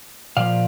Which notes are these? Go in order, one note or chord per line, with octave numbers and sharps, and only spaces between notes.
A#2 F3 D5 F5